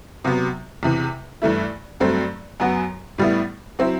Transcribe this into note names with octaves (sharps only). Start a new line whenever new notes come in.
C3 F#3 B3
E2 C3 E3
G2 E3 A3 E4
G2 F#3 A3 C4
F#2 F#3 B3 F#4
A2 G3 B3 E4
F#3 C4 E4